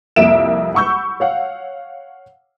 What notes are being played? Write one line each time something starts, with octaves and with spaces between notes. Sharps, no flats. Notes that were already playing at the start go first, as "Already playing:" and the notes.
C2 F2 A#3 E5 D7 E7
F#5 B5 C#6 E6 G6
C#5 F5 F#5